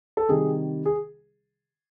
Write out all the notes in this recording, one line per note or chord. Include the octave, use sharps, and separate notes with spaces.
A4
C3 D#3 G3 G#4
G#4